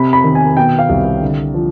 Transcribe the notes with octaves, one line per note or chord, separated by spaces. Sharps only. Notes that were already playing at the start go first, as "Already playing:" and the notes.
Already playing: C3 B5
B5
D#3
G#5
B2 G5
F5
C2
D3
F3